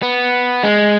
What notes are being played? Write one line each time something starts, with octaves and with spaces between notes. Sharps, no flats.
B3
G#3